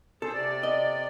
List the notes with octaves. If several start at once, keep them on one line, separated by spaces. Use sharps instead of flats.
G#4 A4 C5
C3 D5
D#5